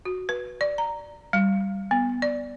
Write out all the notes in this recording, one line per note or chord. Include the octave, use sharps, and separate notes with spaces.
F#4
B4
D5
A#5
G3
B3
D5